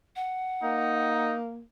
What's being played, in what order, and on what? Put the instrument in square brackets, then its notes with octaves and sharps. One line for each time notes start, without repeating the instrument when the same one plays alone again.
[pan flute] F#5
[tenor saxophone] A#3 [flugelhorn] D#4